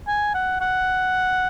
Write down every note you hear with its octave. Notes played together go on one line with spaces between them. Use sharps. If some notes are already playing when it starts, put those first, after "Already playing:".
G#5
F#5
F#5